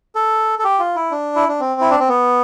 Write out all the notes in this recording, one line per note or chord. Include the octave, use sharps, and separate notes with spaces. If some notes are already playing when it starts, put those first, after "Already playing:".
A4
A4
G4
F4
E4
D4
E4
D4
C4
E4
D4
C4
B3